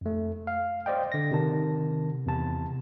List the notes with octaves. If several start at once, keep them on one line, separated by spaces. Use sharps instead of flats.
F2 A3
F5
C5 D5 D#5 G5
D3 A#6
C3 D#3 A5
E2 C3 A5